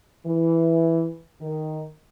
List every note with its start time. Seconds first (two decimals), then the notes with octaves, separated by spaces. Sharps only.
0.26 E3
1.41 D#3